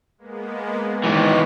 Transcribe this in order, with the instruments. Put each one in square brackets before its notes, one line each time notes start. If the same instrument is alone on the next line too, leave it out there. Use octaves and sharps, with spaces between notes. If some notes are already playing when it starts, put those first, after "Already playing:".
[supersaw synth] G#3 A#3 B3
[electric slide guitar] G#2 D#3 E3 [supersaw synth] B3 B6